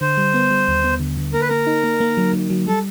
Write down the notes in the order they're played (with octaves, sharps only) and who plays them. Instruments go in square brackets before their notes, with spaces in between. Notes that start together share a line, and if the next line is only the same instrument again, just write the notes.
[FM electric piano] D3 [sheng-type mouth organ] C5
[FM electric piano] G3
B3
G3
D#2
B3
D3
D3
[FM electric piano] A#3 [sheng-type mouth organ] A#4
[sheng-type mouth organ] B4
[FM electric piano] A#3 [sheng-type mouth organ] A#4
[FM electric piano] D#4
A#3
A#3
F#3
F#3
F#3
[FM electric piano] G3 [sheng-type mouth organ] A4